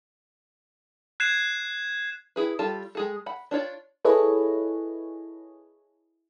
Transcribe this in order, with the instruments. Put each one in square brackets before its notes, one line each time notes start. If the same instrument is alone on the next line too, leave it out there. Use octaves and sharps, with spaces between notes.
[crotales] F#6 G#6 C7 E7
[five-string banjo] E4 G#4 B4
G3 F4 A4 A5
G#3 G#4 A4
F#5 B5
D4 F4 C#5 D5
[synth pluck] E4 G#4 A4 B4 C#5 D#5